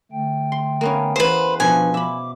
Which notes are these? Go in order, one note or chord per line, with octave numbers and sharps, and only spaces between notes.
D3 A3 G5
C6
A#3 B3 C#4
E2 G#4 B4 C5
B2 F3 D4 B4 G#5
E5 B5 D6